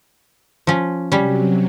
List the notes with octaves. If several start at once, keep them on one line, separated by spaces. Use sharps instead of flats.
F3 C#4
C3 F#3 G3 C#4